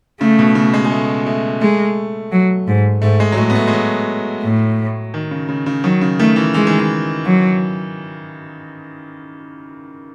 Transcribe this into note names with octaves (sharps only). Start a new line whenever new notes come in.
C#3 A3
B2
C#3
G#3
G#3
A3
A3
G#3 A3
F#3
G#2
G#2 A3
G#3
F#3
A2 G#3
B3
A3
G#3
F#3
A2
D#3
C#3
C#3
C#3
D#3 F#3
C#3
D#3 A3
E3
E3 G#3
D#3
E3
F#3